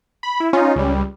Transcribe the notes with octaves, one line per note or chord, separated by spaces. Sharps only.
B5
E4
C#4 D#4 F4
C#2 G3